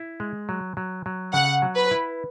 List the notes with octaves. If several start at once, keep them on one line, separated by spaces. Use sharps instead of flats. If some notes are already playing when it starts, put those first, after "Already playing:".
Already playing: E4
G#3
F#3
F#3
F#3
C#3 F#5
F#3
B4
E4